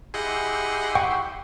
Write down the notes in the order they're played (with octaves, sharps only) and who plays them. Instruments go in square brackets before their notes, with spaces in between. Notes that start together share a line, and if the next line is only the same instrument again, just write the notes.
[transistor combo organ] E4 G4 C6 [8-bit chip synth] G#4 D#5 F#5
[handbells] F#5 G5 C#6